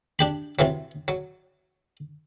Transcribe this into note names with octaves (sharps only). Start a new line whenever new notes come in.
D4 G4 B5
C3 E3 F#3
F#3